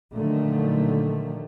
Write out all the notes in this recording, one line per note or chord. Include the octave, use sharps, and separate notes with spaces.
A#2 D3 D#3 F3 F#3 A3